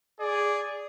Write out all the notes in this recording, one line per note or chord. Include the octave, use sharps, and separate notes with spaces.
G#4 D5